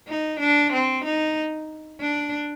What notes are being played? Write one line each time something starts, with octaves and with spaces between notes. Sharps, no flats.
D#4
D4
C4
D#4
D4